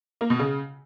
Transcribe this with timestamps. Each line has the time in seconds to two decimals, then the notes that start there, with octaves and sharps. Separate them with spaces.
0.21 A#3
0.30 B2
0.39 C#3